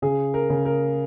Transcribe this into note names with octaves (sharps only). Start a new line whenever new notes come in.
C#3 G#4
A#4
C#3
A#4